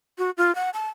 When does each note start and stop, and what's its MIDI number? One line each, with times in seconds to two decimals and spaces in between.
0.18 0.30 66
0.37 0.54 65
0.55 0.70 78
0.74 0.89 81